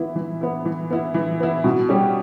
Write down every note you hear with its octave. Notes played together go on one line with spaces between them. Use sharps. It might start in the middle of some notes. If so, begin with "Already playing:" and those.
Already playing: E3 B3 E4
E3
B3 E4
E3
B3 E4
E3
B3 E4
B2
G3 C#4 G4